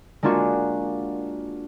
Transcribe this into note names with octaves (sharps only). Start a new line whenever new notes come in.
G#3 A#3 D4 F4 F#4